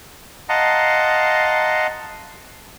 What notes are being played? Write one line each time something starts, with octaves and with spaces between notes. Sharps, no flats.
D#5 F5 F#5 A5 A#5 C6